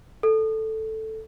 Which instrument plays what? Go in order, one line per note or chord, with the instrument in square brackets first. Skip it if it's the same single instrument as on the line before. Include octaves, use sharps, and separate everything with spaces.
[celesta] A4